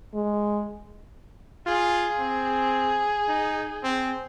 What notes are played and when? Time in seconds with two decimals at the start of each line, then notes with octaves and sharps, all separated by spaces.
0.14 G#3
1.67 F4 G#4
2.19 C4
3.28 D#4
3.84 C4